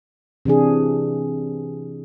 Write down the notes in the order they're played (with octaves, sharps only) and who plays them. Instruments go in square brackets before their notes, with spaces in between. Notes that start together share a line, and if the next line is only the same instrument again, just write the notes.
[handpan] C3 E3 D4 G#4